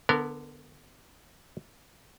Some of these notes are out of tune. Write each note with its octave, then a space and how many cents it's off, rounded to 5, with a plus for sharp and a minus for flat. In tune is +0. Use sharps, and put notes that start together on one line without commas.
D3 +5 B3 +0 A#4 -25